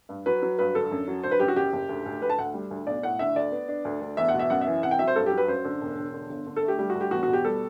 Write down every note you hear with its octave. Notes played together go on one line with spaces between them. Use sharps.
G2
F#3 B4
F#3
G2 B4
D3 A4
F#2
F#3
D3 C5
B4
F#2 G4
F#4
F#1 G4
F#1
D2
D2
D2 B4
A5
D2 F#5
G3
D2
B1 D5
A2 F#5
D3 E5
D2 D5
B3
D4
D2
D2
E2 E5
F#5
B2
E5
F#2 F#5
E5
E3
C3 F#5
G5
F#3 E5
C5
G2 A4
F#3 G4
B4
F#2 C5
D3
E1
E1
D3
G1
D3
A4
A3
G4
G3 G4
F#4
D2
G4
E2 F#4
F#4
B2
G4
G3 A4